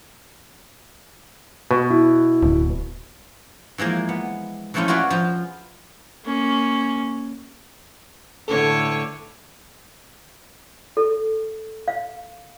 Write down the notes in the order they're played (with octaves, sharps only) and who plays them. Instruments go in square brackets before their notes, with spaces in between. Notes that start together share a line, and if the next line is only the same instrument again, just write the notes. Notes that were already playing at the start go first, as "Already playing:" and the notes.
[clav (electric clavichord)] B2
[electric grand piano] E4 F#4
[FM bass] D1
[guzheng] E3 F3 G#3 A#3
B3
E3 F3 A3 C#4 E4 F4
F4 F#4 G#4 B4 D5
F3 F4
[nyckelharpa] A#3 C#4
[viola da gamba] A2 D3 [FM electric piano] A4 B4 [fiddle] C#5
[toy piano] A4
F5